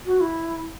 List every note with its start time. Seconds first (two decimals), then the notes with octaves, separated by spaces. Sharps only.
0.06 F#4
0.21 E4